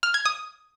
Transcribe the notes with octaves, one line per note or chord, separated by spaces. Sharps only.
F6
G#6
D#6